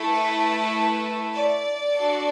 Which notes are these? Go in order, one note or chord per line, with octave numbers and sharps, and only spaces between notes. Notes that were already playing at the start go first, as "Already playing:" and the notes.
Already playing: A3 E4 A4
B4
D5
D4 F#4 A4